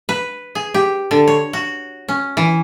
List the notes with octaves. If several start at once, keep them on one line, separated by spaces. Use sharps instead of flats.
B4
G#4
G4
D3
C#5
F#4
C#4
E3